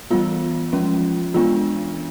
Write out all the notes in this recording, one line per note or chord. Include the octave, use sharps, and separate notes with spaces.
E3 G3 B3 F4
F3 G#3 C#4
E3 G#3 B3 D4 F4